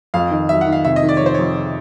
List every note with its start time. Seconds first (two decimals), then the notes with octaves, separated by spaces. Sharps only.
0.14 F2 F5
0.31 D#3
0.49 F#3 E5
0.61 F#5
0.67 D#3
0.72 F5
0.85 C3 E5
0.96 D#5
1.03 D#3
1.09 D5
1.17 C#5
1.21 F2
1.26 C5
1.34 F2 C#5